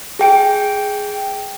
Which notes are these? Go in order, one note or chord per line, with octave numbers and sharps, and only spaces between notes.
G#4 G5 D7